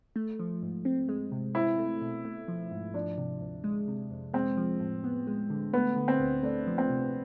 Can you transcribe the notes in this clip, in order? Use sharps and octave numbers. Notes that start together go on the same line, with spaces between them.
A3
F3
G#2
C4
G#3
C3
C4 E4
A3
B2
A3
F3
G#2
F3 D4
C3
D2
G#3
C3
F2
G#3 C4
F3
A2
B3
G#3
D3
A3 B3
D3
C4
D2
A3 D4
F3
C4
C3